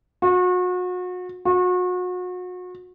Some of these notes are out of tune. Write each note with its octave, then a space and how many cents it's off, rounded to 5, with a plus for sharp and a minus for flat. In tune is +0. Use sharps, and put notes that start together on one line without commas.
F#4 -35
F#4 -35